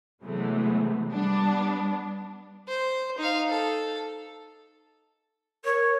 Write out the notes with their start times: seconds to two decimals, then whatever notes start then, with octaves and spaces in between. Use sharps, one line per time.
0.23 C3 E3 F#3 G#3 A3 B3
1.09 G3 B3 D4
2.68 C5
3.18 D#4 F5
3.49 A4
5.65 A#4 C#5